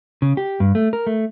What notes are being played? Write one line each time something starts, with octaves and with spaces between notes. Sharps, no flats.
C#3
G4
G2
A3
A#4
A3